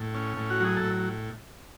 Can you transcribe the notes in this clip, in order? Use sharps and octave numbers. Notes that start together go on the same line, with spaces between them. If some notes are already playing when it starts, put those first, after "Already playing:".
Already playing: A2
C#4
A2
F#4
F#3 G#4
A2 A4